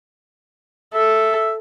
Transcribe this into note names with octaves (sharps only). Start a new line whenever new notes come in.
A4 E5